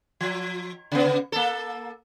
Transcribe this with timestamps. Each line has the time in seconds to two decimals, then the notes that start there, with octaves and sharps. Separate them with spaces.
0.21 F3
0.92 C#3 B3
1.32 A#3 A4